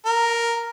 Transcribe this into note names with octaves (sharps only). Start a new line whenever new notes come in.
A#4